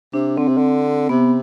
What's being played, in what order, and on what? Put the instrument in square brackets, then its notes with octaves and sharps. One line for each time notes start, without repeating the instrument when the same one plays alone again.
[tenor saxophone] C3 [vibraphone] D4
[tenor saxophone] D3 [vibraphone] C4
[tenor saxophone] C3
D3
[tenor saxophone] C3 [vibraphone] B3